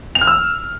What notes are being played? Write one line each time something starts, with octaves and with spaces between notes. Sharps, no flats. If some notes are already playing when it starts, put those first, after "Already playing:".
F7
F6
E6